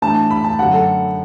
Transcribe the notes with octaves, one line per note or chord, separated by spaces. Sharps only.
A2 E3 D4 A5
B5
A5
F#2 D3 A3 D4 F#5
A4